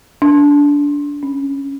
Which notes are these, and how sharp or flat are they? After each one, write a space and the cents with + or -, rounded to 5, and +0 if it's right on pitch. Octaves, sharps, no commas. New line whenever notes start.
D4 -20
C#4 -5